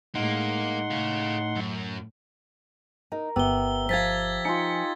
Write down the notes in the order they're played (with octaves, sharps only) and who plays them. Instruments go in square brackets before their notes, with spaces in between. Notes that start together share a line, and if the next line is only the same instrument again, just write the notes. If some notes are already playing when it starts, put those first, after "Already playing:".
[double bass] A2 G#3 [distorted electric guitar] A#3 [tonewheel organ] D#4 F#5 C6
[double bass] A2 [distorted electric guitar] G#4 F5
[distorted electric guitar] F#2
[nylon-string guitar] D#4 [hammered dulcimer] A#4
[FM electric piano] G1 [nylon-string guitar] B3 [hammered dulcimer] G4 E5 [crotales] E6 G7
[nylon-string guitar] F3 F5 [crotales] G#6 A6 B6
[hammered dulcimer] D#4 F4 [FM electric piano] G#5 C#7